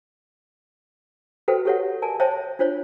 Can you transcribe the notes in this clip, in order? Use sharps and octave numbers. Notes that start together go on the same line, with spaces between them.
F#4 A4 B4 C5 E5 G5
G4 A4 C#5 E5 F#5
A#4 D5 G#5 A5
C5 C#5 D#5 E5 G5 A5
D4 F4 C5 C#5